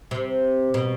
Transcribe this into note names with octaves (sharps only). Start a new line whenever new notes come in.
C3
B2